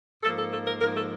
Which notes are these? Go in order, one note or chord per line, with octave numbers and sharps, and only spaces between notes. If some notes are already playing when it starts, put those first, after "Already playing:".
G#2 F3 A#3 A4
A4
A4
A#4
G#2 F3 A#3 A#4
A4